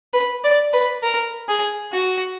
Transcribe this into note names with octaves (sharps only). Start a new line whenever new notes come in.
B4
D5
B4
A#4
G#4
F#4